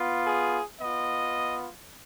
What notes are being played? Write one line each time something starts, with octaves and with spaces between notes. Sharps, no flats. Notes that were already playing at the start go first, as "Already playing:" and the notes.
Already playing: B3 F4
G#4
B3 F4 D#5